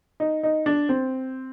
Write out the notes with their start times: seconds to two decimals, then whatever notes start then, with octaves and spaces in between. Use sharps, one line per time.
0.20 D#4
0.43 D#4
0.66 D4
0.89 C4